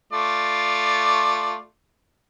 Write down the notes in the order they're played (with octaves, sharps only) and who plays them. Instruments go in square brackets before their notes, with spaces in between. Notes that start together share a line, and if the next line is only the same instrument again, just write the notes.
[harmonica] A3 F4 D5